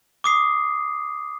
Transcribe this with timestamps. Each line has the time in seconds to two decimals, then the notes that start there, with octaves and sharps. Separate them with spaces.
0.24 D6 D#6 C7